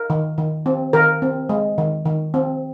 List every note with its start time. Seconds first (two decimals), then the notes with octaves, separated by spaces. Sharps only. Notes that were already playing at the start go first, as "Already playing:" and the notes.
Already playing: A#4
0.10 D#3
0.38 D#3
0.66 C4
0.93 D#3 A#4
1.22 C4
1.49 G#3
1.78 D#3
2.05 D#3
2.34 C4